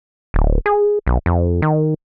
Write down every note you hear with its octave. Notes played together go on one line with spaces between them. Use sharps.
D1
G#4
B1
F2
D#3